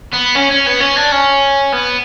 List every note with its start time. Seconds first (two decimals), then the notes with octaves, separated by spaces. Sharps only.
0.13 B3
0.35 C#4
0.51 C#4
0.66 B3
0.80 C#4
0.96 D4
1.12 C#4
1.72 B3